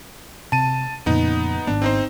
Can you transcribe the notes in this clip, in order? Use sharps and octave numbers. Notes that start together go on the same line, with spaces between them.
C3 A5 D#7
F2 A#2 C#3 B3 D#4
G#1 B3 D4
C4 D#4 C5